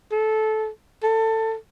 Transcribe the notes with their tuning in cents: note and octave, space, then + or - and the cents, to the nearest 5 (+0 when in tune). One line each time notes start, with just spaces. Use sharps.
A4 -15
A4 +20